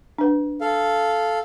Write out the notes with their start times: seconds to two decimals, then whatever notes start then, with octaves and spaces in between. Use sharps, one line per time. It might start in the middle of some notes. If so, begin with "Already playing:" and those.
0.18 D4 B4
0.61 A4 F5